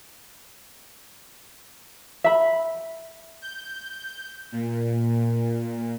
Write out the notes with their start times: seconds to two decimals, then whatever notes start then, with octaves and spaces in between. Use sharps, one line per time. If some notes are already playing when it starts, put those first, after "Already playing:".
2.24 E5 B5
3.42 G6
4.52 A#2